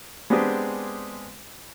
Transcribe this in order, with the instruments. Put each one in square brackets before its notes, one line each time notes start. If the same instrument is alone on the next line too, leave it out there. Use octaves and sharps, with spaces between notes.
[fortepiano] G#3 B3 C4 D4 G4 G#4